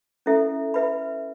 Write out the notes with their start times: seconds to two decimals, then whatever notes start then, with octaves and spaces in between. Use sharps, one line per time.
0.26 C#4 E4 A4 E5
0.74 B4 E5 B5